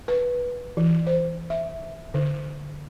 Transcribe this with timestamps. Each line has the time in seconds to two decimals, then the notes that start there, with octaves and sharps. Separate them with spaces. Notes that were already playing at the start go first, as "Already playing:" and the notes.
0.08 B4
0.77 E3
1.07 C5
1.50 E5
2.14 D3